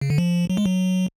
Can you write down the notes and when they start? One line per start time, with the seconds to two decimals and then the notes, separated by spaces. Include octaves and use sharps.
0.01 C#3
0.10 D3
0.18 F3
0.50 F#3
0.57 G#3
0.66 F#3